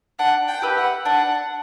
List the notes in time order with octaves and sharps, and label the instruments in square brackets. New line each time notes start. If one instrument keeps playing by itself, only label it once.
[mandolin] D4 [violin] F#5
[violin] G5
[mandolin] G4 B4 E5
[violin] F#5
[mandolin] D4 [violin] F#5